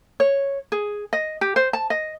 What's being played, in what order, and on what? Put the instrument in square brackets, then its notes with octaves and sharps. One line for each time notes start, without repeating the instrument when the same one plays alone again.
[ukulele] C#5
G#4
D#5
G4
C5
A5
D#5